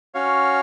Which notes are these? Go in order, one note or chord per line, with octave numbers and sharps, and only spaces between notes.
C#4 F#4 C#5 F5